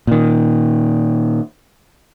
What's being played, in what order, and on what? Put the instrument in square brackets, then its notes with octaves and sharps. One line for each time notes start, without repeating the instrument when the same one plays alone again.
[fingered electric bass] A#2 D#3